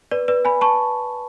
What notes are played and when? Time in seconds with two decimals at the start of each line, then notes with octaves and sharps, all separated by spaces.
0.11 B4 D5
0.28 B4 D5
0.45 G#5 B5
0.61 A5 C#6